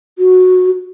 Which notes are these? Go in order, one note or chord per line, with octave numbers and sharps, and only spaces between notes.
F#4